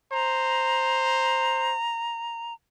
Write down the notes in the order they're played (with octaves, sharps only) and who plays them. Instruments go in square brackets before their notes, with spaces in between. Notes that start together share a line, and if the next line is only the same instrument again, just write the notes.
[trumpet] C5 [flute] A#5